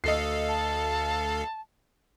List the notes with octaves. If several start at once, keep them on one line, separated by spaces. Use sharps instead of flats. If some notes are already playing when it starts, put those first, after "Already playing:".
D2 A4 D#5 F5 C7
A5